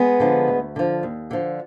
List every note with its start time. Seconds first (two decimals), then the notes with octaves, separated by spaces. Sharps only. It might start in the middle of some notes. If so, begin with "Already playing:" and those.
Already playing: G#3 B3
0.20 D3 F3
0.48 D2
0.76 D3 F3
1.03 D#2
1.31 D3 F3